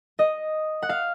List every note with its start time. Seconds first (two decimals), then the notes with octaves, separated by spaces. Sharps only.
0.19 D#5
0.83 F#5
0.89 F5